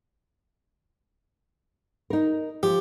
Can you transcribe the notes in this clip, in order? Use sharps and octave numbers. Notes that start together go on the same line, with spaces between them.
D#4 A#4
F3 G4